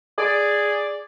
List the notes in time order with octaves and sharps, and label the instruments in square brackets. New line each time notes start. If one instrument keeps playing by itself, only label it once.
[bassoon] G#4 [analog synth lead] D5